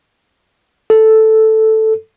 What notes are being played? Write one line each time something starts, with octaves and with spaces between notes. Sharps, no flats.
A4